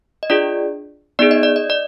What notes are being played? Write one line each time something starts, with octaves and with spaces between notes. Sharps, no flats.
D#5
D4 F4 G#4 D5
B3 D#4 G#4 D5
D#5
D5
D#5
D5